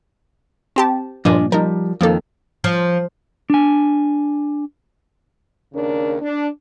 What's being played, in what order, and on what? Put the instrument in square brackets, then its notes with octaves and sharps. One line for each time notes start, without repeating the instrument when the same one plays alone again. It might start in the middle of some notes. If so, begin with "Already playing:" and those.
[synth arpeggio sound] C4 G4 A5
[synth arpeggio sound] G2 A#2 F3 [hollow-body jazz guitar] D4 D#5 G#5
[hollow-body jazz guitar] F3 G3 [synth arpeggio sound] D#4 A#4
[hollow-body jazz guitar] F2 D#3 [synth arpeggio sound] F3 A#3 A4
[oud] F3
[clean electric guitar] D4 G#5
[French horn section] D#2 C#3 D4 A#4
D4